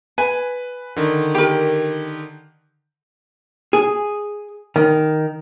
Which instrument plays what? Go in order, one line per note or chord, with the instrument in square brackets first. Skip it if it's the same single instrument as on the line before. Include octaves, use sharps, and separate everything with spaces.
[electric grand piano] B4 [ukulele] G#5
[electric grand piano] D3 D#3
[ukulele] G4 A#4
[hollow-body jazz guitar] G#4
D#3